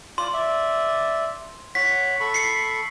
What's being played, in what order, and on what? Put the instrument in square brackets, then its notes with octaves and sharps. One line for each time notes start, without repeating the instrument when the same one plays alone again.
[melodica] F4 D5 [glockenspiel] C6
[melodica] D5 E5
[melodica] C#5 F#5 [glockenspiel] B6
[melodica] A4 B5 C#6
[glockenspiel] C7 C#7